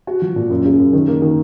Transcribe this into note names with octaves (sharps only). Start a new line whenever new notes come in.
F#4
F3
A#2
F#2
C#3
F#2
D#3
A#3
D#3